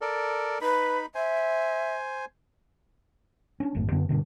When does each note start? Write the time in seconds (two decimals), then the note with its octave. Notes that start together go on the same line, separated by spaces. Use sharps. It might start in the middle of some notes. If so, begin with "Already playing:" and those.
0.01 A4 A#4 D5
0.61 D#4 B4 B5
1.15 C5 E5 G#5
3.60 C#4 D4
3.75 G#1 F#2 A2
3.92 F#2 D3 B3
4.09 G2 B2 D3